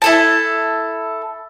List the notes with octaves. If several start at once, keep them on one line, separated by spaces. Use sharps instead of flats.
E4 A4 A5